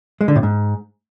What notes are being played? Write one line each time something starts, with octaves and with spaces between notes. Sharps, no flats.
G#3
D3
A2
G#2